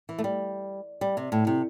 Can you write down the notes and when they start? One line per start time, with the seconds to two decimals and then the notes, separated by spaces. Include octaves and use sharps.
0.09 E3
0.18 A3
0.24 G3
1.01 G3
1.17 C3
1.32 A2
1.47 C3